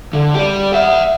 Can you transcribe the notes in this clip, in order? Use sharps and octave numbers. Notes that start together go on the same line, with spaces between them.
D3
G4 D5
E5 F#5